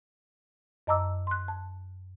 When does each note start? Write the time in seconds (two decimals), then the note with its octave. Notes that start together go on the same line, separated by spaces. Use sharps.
0.87 F#2 D#5 A5 A#5 D6 E6
1.27 C6 F#6
1.48 A5